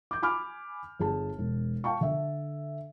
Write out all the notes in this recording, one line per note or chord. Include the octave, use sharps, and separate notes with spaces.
D6 G6
G#5 B5 D6 F6
G1 G#4 A5
E1
F5 G5 A5 C#6
D3 E5